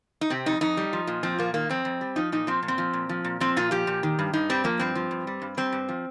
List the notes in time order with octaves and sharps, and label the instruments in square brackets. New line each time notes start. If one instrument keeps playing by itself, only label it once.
[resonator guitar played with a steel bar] D#4
C3 C4
F2 D#4
F2 D#4
G3
F3
A#2
F3 C4
A#2 A#3
D#3 A#3
F2 C4
F2
G3
F3 D#4
A#2 D#4
F3 C4
A#2
C4
F3
A#2
F3
A#2
F3 C4
A#2 F4
F3 G4
A#2
D#3
G2
G2 D#4
G3 C4
F3 A#3
G2 C4
F3
G2
G3
G2
G3 C4
G2
F3